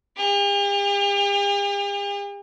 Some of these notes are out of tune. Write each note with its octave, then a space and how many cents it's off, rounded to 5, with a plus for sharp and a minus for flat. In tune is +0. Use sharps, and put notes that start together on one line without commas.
G4 +45